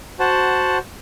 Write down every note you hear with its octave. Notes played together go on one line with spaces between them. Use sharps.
F#4 C5 F#5 A5